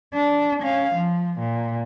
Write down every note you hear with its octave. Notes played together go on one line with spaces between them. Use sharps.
D4
C#4 F5
F3
A#2